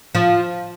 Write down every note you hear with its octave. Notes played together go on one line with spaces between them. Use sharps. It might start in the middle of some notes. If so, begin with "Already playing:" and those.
F3